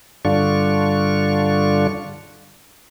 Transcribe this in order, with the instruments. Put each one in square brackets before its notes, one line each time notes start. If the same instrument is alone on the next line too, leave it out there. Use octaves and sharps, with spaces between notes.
[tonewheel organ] G2 D3 D4 F4 C#6